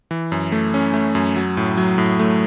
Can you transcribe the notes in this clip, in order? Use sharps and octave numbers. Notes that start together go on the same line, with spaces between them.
E3
F#2
A3
C#4
A3
F#2
F#3
A2
F#3
A2
A3